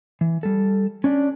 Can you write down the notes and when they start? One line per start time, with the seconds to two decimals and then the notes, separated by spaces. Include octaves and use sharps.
0.21 E3
0.43 G3 A4
1.04 C#4 D4 D5